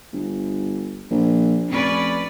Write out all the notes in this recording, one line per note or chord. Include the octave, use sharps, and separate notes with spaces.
G1
A#1
F1 C#4 B4 D5